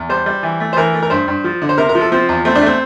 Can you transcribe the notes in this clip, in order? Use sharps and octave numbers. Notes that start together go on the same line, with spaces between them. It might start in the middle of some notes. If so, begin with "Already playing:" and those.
Already playing: E2
G3 C5
G3
E3
A3
C5
E3 A#4
A3
A#4
G2 C5
G2
F3
D3
C5
C3 A#4
A#4
F3
A4
F3 C4
E2
A3 C4
D4
A3 C4